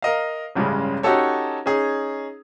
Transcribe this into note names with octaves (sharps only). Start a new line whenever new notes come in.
A#4 D#5 F5
A1 G2 C#3 G#3
C#4 D#4 F#4 G4 A4 C#5
C#4 D#4 G#4